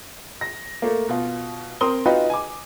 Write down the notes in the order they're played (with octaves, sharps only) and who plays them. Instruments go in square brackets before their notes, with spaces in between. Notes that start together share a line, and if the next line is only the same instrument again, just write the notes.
[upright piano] A#6
A3 A#3
B2 F4
C4 A#4 C6 D#6 G7
D#4 F4 F#4 B4 D#5 G5
G#5 D6